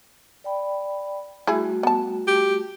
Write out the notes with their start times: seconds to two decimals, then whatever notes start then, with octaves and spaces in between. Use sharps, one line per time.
0.44 D5 G5 B5
1.47 G3 A3 E4 F#4 G#4
1.83 B3 A5
2.27 G4